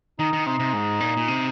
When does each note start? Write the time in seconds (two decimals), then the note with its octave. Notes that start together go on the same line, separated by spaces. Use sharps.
0.19 D#3 D#4
0.33 D#3
0.46 C3 D#4
0.60 C3
0.73 G#2
1.00 A#2
1.17 A#2
1.28 C3